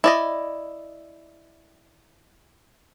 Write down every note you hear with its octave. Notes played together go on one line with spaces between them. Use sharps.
E4 D5 D#5